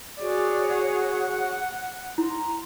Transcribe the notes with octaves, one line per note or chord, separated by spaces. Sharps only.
F#4 G#4 C#5 D5
F#5
E4 A#5 C6